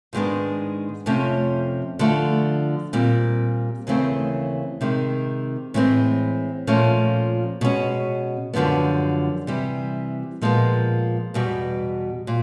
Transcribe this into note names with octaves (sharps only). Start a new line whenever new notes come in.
G#2 D#3 G#3 B3 D4
F2 C3 F3 A3 C#4
D3 F3 A3
A#2 G3 C4
D#2 C#3 E3 A3 C4
C3 D#3 G#3
A2 E3 G#3 C4
A#2 F3 A3 C#4
B2 G#3 C#4
F#2 D3 F3 G#3 B3
C3 E3 G3
A#2 F3 G#3 B3
E2 B2 G3
A#2